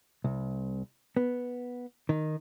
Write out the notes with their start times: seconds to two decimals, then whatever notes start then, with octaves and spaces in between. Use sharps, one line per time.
0.24 C2
1.17 B3
2.09 D#3